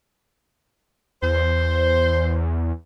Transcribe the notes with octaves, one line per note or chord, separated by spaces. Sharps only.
E2 C5